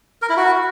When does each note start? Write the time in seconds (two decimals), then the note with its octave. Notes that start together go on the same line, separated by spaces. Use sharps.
0.22 A#4
0.29 E4
0.37 F#4